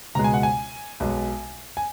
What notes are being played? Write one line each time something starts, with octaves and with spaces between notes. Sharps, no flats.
C#2 B2 G#3 A#5
G#5
F#5
G#5
B1 B2 G#3
G#5